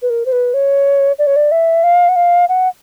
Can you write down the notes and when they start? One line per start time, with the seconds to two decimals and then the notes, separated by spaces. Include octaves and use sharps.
0.02 B4
0.10 A#4
0.26 C5
0.32 B4
0.54 C#5
1.19 D5
1.27 C#5
1.36 D5
1.52 E5
1.84 F5
2.09 F#5
2.16 F5
2.49 F#5